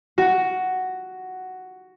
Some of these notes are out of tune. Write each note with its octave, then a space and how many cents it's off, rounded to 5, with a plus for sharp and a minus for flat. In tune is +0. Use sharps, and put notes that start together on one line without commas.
F#4 +5